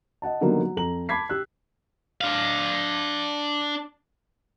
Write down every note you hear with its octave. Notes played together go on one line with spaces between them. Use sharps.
D#5 F#5 A5
D3 D#3 F#3 G3 A#3 B3
F#3
F2 A4 A#5 F#7
A5 B5 D6 G#6 B6 C7
G4 E6 F#6
D4 F5